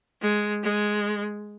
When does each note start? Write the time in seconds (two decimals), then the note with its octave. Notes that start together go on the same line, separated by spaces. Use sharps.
0.22 G#3
0.63 G#3